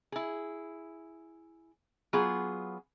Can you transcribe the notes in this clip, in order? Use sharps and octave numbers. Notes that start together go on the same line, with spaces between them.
E4 G#4
F#3 B3 F4 G#4